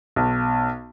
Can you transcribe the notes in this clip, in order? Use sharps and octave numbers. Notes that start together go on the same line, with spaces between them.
B1